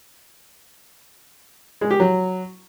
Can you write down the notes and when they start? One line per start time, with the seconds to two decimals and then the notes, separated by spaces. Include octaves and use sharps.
1.81 G#3
1.91 G4
2.00 F#3